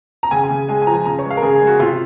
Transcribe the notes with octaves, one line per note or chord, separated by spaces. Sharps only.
A#5
C#3 G#5
G#5
C#3
G#3 G#5
G#5
F3 A#5
G#5
C#3 A#5
C#5
G#3
F5
A#4
C#3 G#4
G#4
G#3
F#4
C3 F4